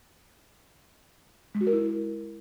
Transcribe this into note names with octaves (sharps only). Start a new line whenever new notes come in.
G#3
F#4
A#4
E4